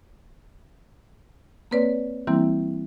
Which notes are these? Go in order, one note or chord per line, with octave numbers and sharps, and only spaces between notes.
A#3 C4 B4 C#5 D5
E3 G3 A#3 C4 E4